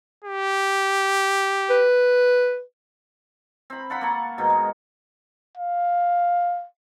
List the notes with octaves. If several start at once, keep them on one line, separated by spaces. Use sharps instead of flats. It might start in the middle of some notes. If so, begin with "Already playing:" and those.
G4
B4
C4 B5
F4 A4 F#5 B5
A#3 A4 C#6
G#2 B2 D#3
G#3
F5